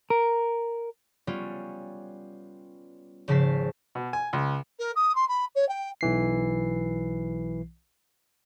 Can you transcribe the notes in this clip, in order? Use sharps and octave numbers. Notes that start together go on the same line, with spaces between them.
A#4
G3 B3 C#4 F4
G#1 C#3 F3 A5 B6 C7
B2
G#5
C#2
A#4
D#6
C6
B5
C#5
G5
B1 E3 C7